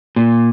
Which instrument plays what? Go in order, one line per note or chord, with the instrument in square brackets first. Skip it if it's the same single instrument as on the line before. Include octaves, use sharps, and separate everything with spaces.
[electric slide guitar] A#2